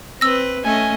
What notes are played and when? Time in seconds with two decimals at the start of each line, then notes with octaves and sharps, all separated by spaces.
0.21 C4 B4 E6 A#6
0.65 A3 C#4 D#5 G#5